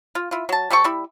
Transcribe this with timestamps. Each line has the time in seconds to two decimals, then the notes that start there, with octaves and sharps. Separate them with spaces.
0.15 F4
0.31 E4 F4
0.49 F#3 A5
0.70 G3 C4 A4 C#6
0.84 G3 E4